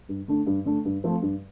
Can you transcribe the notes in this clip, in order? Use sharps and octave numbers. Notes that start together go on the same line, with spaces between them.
G2
D3 A3 D4
G2
D3 A3 D4
G2
F3 A3 C4
G2